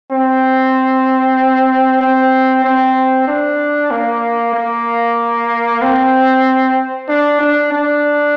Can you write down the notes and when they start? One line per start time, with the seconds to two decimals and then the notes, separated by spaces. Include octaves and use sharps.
0.11 C4
2.01 C4
2.64 C4
3.28 D4
3.91 A#3
4.55 A#3
5.82 C4
7.08 D4
7.40 D4
7.72 D4